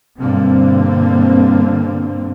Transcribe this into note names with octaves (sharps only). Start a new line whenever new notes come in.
G2 B2 D3 A#3 C4